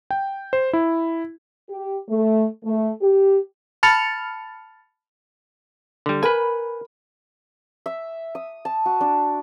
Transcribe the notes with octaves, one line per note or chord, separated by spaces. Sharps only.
G5
C5
E4
G4
A3
A3
G4
A5 B5 F6 A6 C#7 F7
D3 G3
A#4 B4 G#5 B5
E5
D#6
A5
F#4
D4